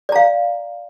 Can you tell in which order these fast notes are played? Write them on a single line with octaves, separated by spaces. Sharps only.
D5 A#5 F5